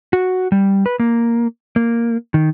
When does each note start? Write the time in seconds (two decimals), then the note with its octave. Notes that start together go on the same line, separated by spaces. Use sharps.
0.13 F#4
0.52 G3
0.86 B4
1.00 A#3
1.76 A#3
2.34 D#3